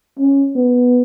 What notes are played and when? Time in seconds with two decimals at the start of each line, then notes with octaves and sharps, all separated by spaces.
0.19 C#4
0.56 B3